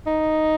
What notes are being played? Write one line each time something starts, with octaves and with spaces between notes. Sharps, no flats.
D#4